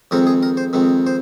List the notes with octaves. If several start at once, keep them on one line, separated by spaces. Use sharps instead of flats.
F2 D#3 G#3 C4 A#4
G#4
A#4
C5
F2 D#3 G#3 C4
C5